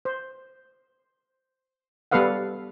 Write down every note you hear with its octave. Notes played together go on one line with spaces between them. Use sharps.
C5
G3 B3 A4 B4 F5 F#5